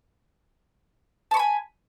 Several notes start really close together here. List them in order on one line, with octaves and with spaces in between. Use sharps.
A5 C#6 B5 G#5